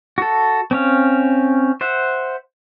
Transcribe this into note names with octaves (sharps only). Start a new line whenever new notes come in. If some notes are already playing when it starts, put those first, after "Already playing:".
F#4 A4
C4 C#4 F5
C5 E5 F#5